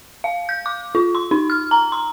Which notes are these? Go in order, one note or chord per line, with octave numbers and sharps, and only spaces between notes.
F5
G6
D6
F4
C6
D#4
F6
A#5
C6